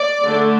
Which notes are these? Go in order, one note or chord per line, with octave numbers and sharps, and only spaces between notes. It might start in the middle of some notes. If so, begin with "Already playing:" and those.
Already playing: D5
D3 A3 D4